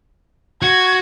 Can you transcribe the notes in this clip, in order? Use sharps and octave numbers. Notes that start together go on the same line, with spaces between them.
F#4 F#5 G#6